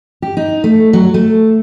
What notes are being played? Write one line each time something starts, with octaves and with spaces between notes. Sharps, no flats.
G4
D#4
A3
F#3
A3